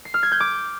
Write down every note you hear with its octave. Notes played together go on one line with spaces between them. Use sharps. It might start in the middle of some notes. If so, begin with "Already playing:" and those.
C7
F6
G#6
G6
D6